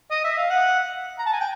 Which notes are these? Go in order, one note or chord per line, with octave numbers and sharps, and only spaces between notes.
D#5
E5
F5
F#5
A#5
A5
G#5
G5